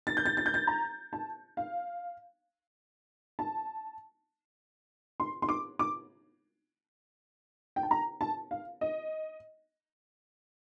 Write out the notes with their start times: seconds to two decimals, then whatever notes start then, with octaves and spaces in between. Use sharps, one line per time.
0.07 A6
0.17 G6
0.26 A6
0.37 A6
0.46 G6
0.54 A6
0.67 A#5
1.13 A5
1.57 F5
3.39 A5
5.20 C6
5.42 C6
5.49 D6
5.79 D6
7.76 G5
7.83 A5
7.91 A#5
8.21 A5
8.51 F5
8.81 D#5